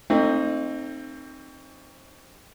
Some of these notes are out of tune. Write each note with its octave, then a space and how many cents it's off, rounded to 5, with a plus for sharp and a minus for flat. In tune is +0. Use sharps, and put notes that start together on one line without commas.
A3 +45 C4 +20 D#4 -15